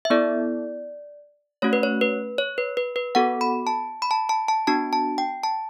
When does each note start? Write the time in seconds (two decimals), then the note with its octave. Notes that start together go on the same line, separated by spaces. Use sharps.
0.05 E5
0.10 B3 E4 A4 D5
1.62 A3 C#4 F#4 C#5
1.73 B4
1.83 C#5
2.01 B4
2.38 C#5
2.58 B4
2.77 B4
2.96 B4
3.15 B3 F#4 A4 F#5
3.41 B5
3.67 A5
4.02 B5
4.11 A5
4.29 A5
4.48 A5
4.67 B3 D4 F#4 A5
4.93 A5
5.18 G5
5.44 A5